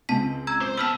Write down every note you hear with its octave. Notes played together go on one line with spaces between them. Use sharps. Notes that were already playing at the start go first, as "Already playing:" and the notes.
C#2 C4 A5 B6
A#5 E6 G#6
C5
B3 A5 E6 F6 B6